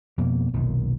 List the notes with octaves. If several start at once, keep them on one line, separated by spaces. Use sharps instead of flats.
F2 B2 A#3
F1 B1 A#2 D#3